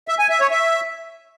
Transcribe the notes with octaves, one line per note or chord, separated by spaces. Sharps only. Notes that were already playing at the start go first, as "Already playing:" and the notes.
E5
G#5
E5
C#5
E5